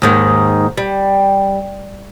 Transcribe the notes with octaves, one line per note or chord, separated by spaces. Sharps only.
D#2 G#2 D#3
G3